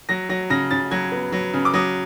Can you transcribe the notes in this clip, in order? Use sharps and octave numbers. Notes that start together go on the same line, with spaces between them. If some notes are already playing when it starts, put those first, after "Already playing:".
F#3 A#6
F#3 A#6
C#3 A#6
C#3 A6
F#3 G#6
B3
F#3
C#3
D6
F#3 D#6